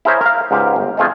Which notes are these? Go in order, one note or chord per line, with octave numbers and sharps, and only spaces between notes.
E4 G#4 A#4 C5 C#5 E5
A#4 F5
C#2 G#2 G4 F5
G1
G#3 A3 C4 F4 G#4